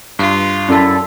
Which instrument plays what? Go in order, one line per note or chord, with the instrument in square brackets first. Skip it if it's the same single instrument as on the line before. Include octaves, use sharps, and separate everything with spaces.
[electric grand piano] G2 [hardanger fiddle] F4
[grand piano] F#2 [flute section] E4 A4 D5